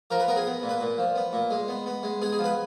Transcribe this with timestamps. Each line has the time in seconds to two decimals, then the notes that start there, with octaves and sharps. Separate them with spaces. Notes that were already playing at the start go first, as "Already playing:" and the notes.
0.11 F3 A#4
0.20 B4
0.28 B3 A#4
0.36 G#4
0.45 B3
0.63 A#2
0.69 B4
0.81 A#2
0.98 F3
1.16 B3
1.33 A#2
1.50 G#3
1.68 B3
1.86 B3
2.03 G#3
2.22 B3 G#4
2.32 G#4
2.39 F3
2.44 B4